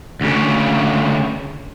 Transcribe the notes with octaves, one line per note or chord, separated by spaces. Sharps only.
D2 C#3